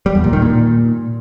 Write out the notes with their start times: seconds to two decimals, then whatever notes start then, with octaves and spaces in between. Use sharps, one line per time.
0.06 G3
0.15 E2
0.24 A#2
0.33 D#3
0.42 A#2